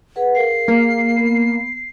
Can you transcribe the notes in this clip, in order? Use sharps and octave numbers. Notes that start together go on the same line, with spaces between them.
G#4 B4 F#5
G#4 A#4 F5 C7
A#3
B3